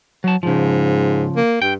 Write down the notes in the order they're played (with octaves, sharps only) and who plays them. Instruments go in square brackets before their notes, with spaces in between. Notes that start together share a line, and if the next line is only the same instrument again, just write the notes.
[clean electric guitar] F#3 A5
[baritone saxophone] G#2 [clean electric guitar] C#3 F3
[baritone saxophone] A#3
[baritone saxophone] G2 [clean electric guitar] G5